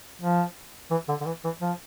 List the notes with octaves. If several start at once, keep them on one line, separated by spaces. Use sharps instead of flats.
F3
E3
D3
D3
E3
E3
F3